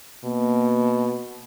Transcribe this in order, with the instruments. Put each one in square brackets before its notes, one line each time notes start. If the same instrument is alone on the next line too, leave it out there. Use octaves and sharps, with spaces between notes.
[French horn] B2 [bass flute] A#3